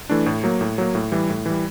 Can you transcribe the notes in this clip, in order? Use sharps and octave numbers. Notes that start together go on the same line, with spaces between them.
E3 A3 D4
A2
F#3 A#3
A2
F#3 A#3
A2
E3 G3
A2
E3 G3